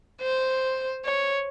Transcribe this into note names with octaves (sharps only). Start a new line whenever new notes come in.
C5
C#5